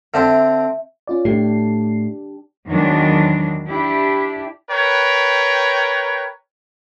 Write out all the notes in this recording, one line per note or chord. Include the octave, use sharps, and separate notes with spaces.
D3 C4 D4 E5
C#4 F4 D5
A2 A3 D4 G4 C7
E2 D#3 F#3 G#3 D4
D4 E4 G4
A#4 B4 C#5 G5